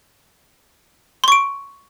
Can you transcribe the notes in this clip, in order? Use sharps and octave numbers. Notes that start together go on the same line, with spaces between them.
C6 C#6 D7